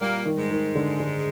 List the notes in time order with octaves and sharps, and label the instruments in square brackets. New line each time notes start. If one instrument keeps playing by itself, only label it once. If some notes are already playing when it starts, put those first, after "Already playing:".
[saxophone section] A#2 A#3 [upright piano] G3
[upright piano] D#3
[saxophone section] G#2 G#3
[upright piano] D#3
D3
D3